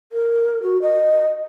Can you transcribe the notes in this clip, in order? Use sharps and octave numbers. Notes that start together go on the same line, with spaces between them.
A#4
F#4
D#5